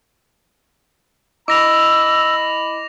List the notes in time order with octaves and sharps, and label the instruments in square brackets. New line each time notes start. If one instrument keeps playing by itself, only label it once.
[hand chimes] E4 D#5 D7 [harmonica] B5 [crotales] D6 A#6 F7 [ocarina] E6